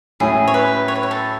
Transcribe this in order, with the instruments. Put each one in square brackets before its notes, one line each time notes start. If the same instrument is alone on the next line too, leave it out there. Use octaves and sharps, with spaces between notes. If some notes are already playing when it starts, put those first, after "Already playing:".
[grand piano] A2 F#3 C#4 E4 [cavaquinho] G#4
[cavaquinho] C#5
B4
C#5
B4
C#5
A4